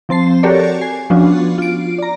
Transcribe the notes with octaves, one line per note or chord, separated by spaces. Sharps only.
F3 C4 A5 C7
F#4 G4 A4 A#4 C#5 D5
G#5 C7
F3 B3 C#4 D4 F4 F#4
F4 D7
D5 A#5